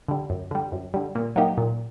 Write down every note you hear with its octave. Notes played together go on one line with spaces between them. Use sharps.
D3 G3
F#2
D3 G3
F#2
D3 G3
A#2
F#3 A#3 D#4 G4
A#2